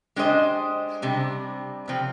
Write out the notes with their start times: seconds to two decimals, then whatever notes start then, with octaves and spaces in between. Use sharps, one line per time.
0.16 G#3 D4 G4 C5 D#5
1.02 C3 G3 D4
1.88 C3 F3 C4